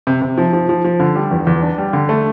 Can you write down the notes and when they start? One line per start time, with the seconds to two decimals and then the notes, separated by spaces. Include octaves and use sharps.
0.07 C3
0.22 C3
0.38 F3
0.53 F3
0.69 F3
0.85 F3
1.00 D3
1.15 G3
1.31 E2
1.47 E2
1.63 D4
1.78 G3
1.93 D3
2.09 A3